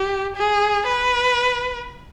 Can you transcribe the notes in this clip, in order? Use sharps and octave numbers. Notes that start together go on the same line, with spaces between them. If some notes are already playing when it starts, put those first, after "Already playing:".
Already playing: G4
G#4
B4